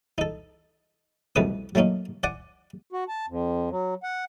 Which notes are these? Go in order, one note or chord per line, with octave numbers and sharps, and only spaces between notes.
D#4 A4
C2 F2 B2 A3 B4 D#6
F#3 A3 A#3 C#4 D#4
D5 F#5 G#5
F#4
A5
F2
F#3
F#5